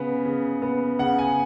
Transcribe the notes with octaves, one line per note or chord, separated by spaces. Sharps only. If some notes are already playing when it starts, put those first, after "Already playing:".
Already playing: C#3 B3
C#3
B3
C#3 F#5
G#5